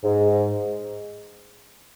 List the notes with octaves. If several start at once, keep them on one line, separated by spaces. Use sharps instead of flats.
G#2